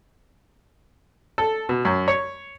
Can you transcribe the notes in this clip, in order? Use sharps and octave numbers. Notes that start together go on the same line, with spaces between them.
A4
B2
F#2
C#5